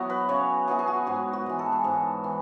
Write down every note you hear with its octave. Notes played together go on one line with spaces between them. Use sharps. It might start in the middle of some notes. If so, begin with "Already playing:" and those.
Already playing: F#3 B3 E4 F#4
B4
C#3 C#5
F#3 B3 E4 G#4
G#4
F#4
G#2 F#4
F#4
E3 G#3
A4
G#4
G#2 A4
E3